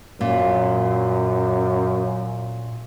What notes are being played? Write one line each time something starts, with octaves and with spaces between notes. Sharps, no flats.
F#2 A#2